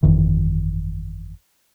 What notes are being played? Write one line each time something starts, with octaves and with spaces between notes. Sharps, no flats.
G1 F2 D#3 E3